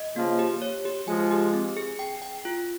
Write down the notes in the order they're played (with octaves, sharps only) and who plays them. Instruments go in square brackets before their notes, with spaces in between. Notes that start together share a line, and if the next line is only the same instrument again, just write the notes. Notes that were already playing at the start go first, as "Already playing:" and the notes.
Already playing: [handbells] D#5
[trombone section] C#3 F3 [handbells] A#3
[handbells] G4
C#5
G4
[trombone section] F3 G#3 [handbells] G#5
[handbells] G4
C4
G#4
G5
G5
F4